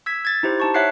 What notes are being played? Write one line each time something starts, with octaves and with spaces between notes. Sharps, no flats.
E6 G#6 B6
G#6 A6
D#4 E4 G4 C5
D#4 A5 C#6
C#5 E5 F#5 F#6 C7